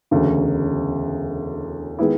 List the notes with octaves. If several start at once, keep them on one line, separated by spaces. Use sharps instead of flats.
E1 D2 C#3
D#3 G#3 B3 E4